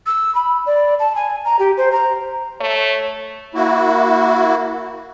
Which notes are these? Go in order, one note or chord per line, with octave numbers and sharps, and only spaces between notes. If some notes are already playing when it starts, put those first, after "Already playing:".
E6
B5
D5
A5
G#5
A#5
G4
C5
A#5
A3 C#5
A#3 E4 F#4